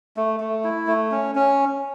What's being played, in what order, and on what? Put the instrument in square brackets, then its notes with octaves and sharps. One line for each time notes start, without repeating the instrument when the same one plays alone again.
[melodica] A3
A3
E4
A3
C#4
C#4